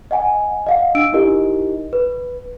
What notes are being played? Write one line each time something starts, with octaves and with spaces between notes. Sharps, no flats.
D#5 F#5 G#5
D#5 F5 F#5
D4 E6 D7
D#4 E4 G4 A#4 D#5
B4